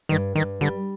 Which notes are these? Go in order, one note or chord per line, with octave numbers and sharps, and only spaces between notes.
G2 D#3
G2 D#3
D3 G3